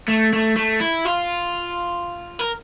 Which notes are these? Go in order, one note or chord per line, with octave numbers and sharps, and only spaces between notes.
A3
A3
A3
E4
F4
A#4